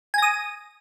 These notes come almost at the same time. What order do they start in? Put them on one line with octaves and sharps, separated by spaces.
G#5 A#6 D#6